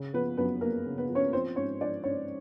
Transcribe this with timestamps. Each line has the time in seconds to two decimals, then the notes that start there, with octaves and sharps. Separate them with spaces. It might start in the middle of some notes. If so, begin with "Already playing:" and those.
Already playing: C#3
0.14 F3 B3 B4
0.37 F#2 B3 B4
0.61 F#2 A#3 A#4
0.85 C#3
0.98 B3 B4
1.09 F3
1.15 C#4 C#5
1.33 F3 C4 C5
1.56 G#2 C#4 C#5
1.81 F3 D4 D5
2.04 G#2 C#4 C#5